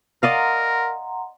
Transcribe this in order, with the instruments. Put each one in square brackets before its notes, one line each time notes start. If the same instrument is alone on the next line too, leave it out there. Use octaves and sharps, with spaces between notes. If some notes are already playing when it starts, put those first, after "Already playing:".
[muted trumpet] A#4 [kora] D5 D#5 F5 [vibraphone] F#5 A#5 C6